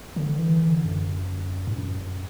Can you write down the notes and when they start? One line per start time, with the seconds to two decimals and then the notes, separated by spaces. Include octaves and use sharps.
0.16 D3
0.39 E3
0.61 D3
0.85 F#2
1.67 G2
1.77 F#2